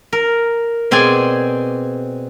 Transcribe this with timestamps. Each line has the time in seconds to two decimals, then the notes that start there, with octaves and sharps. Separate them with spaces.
0.13 A#4
0.91 B2 C4 G#4 D5 G#5